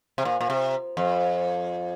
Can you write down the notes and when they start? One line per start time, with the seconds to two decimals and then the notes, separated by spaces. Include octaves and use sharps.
0.18 C3
0.25 A#2
0.41 A#2
0.50 C3
0.97 F2